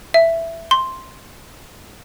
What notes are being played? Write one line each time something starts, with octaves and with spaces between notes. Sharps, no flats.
E5
C6